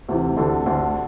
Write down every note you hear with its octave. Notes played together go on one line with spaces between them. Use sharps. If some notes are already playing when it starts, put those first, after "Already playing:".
D2 C3 E3
D2 D3 A4
D2 D3